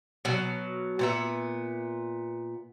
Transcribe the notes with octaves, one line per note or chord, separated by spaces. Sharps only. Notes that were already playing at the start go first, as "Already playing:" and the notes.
B2 F#3
A#2 B3 E5